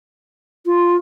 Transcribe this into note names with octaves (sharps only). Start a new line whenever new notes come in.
F4